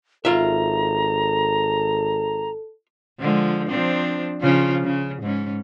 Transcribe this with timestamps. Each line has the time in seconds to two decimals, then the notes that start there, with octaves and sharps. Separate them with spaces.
0.25 G#1 F4 A4 E5 A#5
3.20 D3 F3 G#3
3.68 F3 C4 D4
4.41 C#3 F3 F4
4.84 C#3
5.22 G#2 C#4